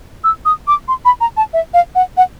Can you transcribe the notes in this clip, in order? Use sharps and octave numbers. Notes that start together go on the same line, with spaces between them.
E6
D#6
D6
C6
B5
A#5
A5
E5
F5
F#5
F#5